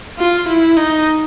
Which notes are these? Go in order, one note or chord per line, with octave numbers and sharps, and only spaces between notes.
F4
E4
D#4